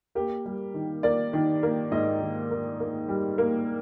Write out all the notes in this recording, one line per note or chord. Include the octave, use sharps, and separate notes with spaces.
A#3 G4
G3
D#3
A#3 D5
D#3
A#3
G#2 D#5
D#3
A#3
A#3
G3
A#3